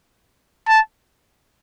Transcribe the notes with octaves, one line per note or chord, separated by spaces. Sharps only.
A5